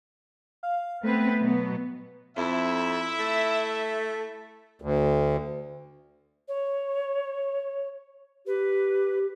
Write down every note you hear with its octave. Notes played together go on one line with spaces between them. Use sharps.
F5
A3 B3 C4 B4
B2 F#3 B3
F2 E4 E5
A3
D2
C#5
G4 B4